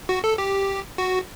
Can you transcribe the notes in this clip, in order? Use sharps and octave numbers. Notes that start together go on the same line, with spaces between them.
F#4
A4
G4
F#4